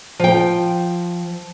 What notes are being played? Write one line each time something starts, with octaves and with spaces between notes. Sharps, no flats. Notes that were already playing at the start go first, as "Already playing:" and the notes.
F3 G5